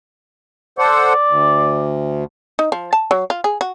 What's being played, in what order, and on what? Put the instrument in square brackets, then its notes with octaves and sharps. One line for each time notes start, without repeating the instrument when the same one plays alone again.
[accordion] A4 C5 F#5 [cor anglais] D5
[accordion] D2
[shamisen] D#4
F3
A5
F#3
F4
G#4
F#4